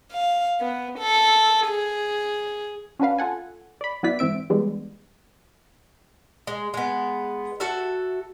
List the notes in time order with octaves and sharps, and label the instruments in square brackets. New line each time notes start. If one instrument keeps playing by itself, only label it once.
[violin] F5
B3
A4
G#4
[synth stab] C#4 D4 F#4 B4 F5
F4 A4 F#5 G#5
D5 B5
F#3 B3 E4 B4 D5 B6
G#2 E3 C4 E5 D7
E3 G3 G#3 B3 D4
[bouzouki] G#3
G#3 B3
F#4 A4 E5